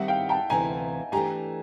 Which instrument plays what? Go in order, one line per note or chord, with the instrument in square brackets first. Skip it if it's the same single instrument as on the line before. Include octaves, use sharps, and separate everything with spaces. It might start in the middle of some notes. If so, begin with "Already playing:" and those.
Already playing: [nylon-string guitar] D#3 G3 C4 [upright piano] E5 F#5
[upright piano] F5 G5
G5 A5
[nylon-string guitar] D2 C3 E3 [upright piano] G#5 A#5
[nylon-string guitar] E3 A3 D4 G4 [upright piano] G#5 A#5